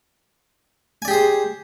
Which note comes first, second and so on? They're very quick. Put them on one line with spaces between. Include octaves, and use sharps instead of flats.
G#5 D5 G4 G#4 C5